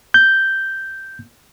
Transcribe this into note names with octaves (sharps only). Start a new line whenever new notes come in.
G6